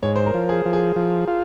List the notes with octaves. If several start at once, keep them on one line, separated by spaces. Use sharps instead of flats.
G#2 C#5
C5
A#4
F3
G#4
F3
G#4
F3
F4